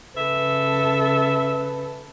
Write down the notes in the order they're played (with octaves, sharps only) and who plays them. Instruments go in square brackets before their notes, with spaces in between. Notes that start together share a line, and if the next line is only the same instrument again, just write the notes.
[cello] C#3 A4 [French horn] B4 [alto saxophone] E5